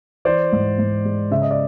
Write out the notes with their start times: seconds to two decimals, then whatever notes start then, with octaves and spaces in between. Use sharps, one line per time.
0.25 E3 C5 D5
0.52 G#2
0.78 G#2
1.05 G#3
1.31 C#3 E5
1.42 D#5
1.51 D5